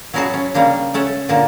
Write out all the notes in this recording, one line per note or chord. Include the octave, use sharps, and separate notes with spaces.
F#3 C#4 E4 F#4 G#4 A5
C#4
C#3 G3 A#3 D4
A3 C#4 A4 F#5
A#2 D3 A#3 A5